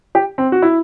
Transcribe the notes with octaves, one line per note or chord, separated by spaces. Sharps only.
G4
C4
F#4
E4